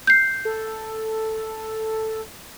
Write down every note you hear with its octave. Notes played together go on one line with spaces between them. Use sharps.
G6 C7
A4